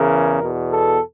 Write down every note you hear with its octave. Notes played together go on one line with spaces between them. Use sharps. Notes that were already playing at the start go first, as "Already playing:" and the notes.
Already playing: E2 C#3 E3 A#4
E2 B2
A4